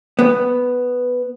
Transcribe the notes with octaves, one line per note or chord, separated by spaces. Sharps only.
B3